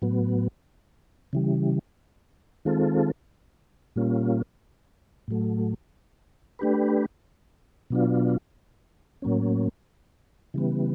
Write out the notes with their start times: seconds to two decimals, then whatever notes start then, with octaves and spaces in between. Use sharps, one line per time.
0.02 A2 F#3 B3
1.33 C#3 E3 G3
2.65 D#3 G#3 C4 F4 A4
3.96 A#2 G3 A#3 C#4 F4
5.28 A2 F#3 A3
6.59 A3 D4 G4 B4
7.90 B2 F#3 B3 D4 F4
9.22 A2 F#3 A#3 C#4
10.54 C#3 E3 G3 B3